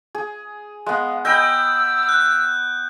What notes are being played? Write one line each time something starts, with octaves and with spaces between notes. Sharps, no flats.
G#4
G#3 B3 F5
D#5 G5 B5 E6 G6
F#6